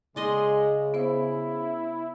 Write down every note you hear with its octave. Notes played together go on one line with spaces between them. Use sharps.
C#3 G#3 D5 D#5 C6
B3 E4 C5